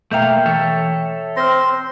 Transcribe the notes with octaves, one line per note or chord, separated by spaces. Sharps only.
B2 A3 A#3 E5 F5 G5 A#5 G6
E3 A4 C#5 E5
C4 C5 C6 F6 A#6